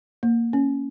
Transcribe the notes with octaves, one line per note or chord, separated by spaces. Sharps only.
A#3
C#4